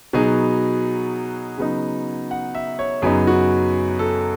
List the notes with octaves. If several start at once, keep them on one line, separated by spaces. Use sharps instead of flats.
B2 F#3 B3 D#4 G#4
C#3 F#3 B3 D#4
F#5
E5
C#5
F#2 C#3 F#3 B3 D#4 G#4
F#4
A4